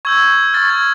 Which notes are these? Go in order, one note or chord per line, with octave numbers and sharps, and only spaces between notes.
C#6 E6 G6 G#6
C#6 F6 A6
G#6